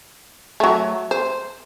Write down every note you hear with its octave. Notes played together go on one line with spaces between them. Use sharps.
F#3 A3
C5